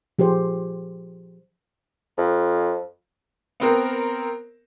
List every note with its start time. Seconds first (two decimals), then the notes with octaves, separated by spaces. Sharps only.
0.19 F3 G4 G#4 C5
2.18 F2
3.60 B3 C4 A#4